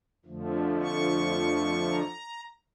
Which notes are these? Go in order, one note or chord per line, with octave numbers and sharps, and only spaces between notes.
F2 D3 F3 A3
C#6
A#5